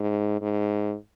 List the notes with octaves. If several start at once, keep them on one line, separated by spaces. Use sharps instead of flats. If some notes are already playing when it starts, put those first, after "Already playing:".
Already playing: G#2
G#2